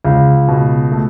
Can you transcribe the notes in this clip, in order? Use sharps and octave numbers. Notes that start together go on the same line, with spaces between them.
C#2
B2
A3